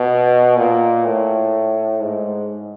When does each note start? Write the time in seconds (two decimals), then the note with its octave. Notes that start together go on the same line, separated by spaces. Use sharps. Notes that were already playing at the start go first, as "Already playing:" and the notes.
Already playing: B2
0.57 A#2
1.05 A2
2.02 G#2